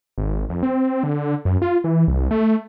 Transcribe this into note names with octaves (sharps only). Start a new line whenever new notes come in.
G#1
F2
C4
D3
F#2
F4
E3
C2
A3